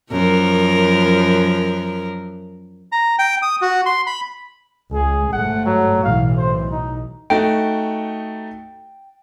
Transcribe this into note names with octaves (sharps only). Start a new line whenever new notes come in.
F#2 F3 A#4
A#5
G5
D#6
F#4
C6
B5
C#2 G#4
G1 G#2 A3 F#5
F#3
B1 A2 E3 F5
C5
D#4
A3 D#4 F#4 G5